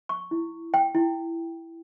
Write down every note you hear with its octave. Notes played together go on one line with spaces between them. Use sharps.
C#6
E4
G5
E4